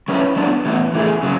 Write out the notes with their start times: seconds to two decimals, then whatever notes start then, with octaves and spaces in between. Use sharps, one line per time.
0.08 F#3 C#4 E4 B4
0.36 F#3 B3 D4
0.65 A2 E3 B3
0.94 E3 A3 E4 G#4
1.23 C#3 F#3